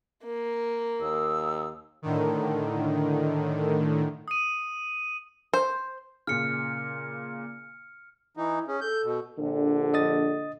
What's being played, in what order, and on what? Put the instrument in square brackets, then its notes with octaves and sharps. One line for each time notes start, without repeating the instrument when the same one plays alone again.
[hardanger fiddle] A#3
[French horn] D#2 [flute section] F5 D#6 E6
[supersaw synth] A2 D3 D#3
[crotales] D#6 D#7
[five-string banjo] C5
[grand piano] A#2 C#3 [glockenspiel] F6 C#7
[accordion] E3 D#4 [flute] E4
[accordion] C#4 [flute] G#4
[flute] A4 [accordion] G6
[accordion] B2
[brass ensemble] A#1 [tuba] D3
[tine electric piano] D#5 D#6 A6